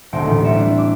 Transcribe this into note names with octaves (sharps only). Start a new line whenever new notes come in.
D#1 D2 B2 G#3 C5 D7
A1 B3
G3 C4 E5 C#7 E7
D4 E4
D6